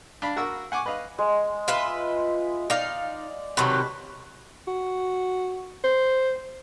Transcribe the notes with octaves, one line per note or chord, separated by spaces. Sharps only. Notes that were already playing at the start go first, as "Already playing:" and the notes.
D4 F5 B5
F#4 A#4 E6
F#5 G#5 C#6 D6
B4 D#5 F5
G#3
F4 B4 E5
D#4 D5 F5
C3 D#3 F#3 B4 A5
F#4
C5